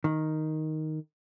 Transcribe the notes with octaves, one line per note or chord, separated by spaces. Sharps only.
D#3